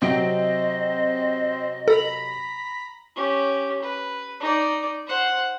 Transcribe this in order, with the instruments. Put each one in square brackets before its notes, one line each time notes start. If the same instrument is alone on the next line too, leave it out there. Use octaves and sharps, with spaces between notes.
[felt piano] C3 F#3 D7 [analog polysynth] C4 [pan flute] D#5
[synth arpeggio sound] A4 [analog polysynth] A#5 B5
[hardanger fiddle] C#4 G4
B4
D#4 D5
C5 F#5